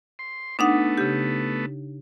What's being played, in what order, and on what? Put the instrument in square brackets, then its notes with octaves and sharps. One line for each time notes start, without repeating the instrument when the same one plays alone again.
[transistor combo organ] C6
[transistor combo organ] A3 B3 [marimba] D4 D#4 F#5
[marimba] C#3 G4